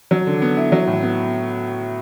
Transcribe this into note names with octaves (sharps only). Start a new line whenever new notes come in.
F#3
D3
B3
E4
F#3
A2
B3